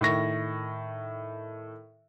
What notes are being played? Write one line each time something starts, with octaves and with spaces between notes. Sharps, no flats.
A2 D#3 C#6 A#6